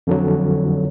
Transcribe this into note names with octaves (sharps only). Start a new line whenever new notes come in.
F2 D3 F#3